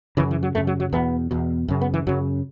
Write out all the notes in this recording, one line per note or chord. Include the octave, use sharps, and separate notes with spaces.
F#2 C#3 E3
E3
F#3
F#2 C#3 A3
F#3
F#3
E2 B2 B3
E2 B2
F#2 C#3
B3
E3
F#2 C#3 F#3